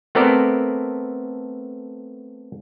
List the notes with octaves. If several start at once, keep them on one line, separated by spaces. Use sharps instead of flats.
A3 B3 C4 A4 A#4 D5